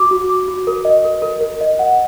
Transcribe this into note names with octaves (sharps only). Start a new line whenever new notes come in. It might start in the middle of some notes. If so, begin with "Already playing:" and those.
Already playing: F#4 D6
F#4
D6
F#4
A#4
D#5
A#4
A#4
A#4
D#5
F#5